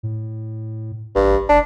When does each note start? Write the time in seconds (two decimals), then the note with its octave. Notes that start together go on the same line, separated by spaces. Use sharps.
0.03 A2
1.15 A1 G2
1.49 F1 D4